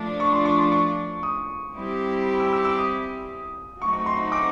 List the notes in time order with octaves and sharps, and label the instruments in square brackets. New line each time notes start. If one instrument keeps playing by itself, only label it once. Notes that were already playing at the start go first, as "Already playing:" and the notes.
Already playing: [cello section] F3 A3 D4
[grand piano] C#6
C6
C#6
C6
C#6
D#6
[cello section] G3 C4 E4 G4
[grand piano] E6
E6
E6
D#6
[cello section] F#3 A3 C4 D#4 F#4 [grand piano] C#6
[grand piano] C#6
C6
D6